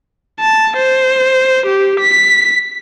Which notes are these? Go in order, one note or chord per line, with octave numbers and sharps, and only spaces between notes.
A5
C5
G4
B6